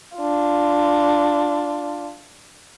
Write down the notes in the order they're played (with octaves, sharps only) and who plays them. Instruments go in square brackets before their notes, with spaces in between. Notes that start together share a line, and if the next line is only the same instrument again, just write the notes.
[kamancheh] D4 F4